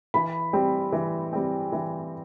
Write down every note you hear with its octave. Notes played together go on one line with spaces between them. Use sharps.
E3 B5
G3 C4
E3
G3 C4
E3